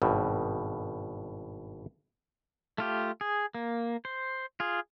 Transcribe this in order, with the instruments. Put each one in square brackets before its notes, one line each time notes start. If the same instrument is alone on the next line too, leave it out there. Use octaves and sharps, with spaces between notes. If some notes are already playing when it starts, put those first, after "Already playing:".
[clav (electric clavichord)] G#1 G2 B2
[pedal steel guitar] A3 F4 G4
G#4
A#3
C5
F4 G#4